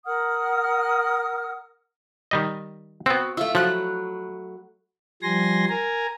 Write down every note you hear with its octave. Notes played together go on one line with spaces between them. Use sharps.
A#4 F#5 D#6 F6
D#3 G3 D#5
B3 C4 F#4
A3 F4 E5
F3 F#3 B5 F#6
F3 G3 G#5 C6 A#6
A#4 G#5 A#5